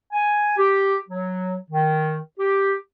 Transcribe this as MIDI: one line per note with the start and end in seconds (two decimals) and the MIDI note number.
0.13 0.57 80
0.57 0.96 67
1.09 1.56 54
1.71 2.17 51
2.38 2.73 67